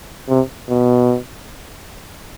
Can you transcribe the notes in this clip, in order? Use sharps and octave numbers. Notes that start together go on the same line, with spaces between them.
C3
B2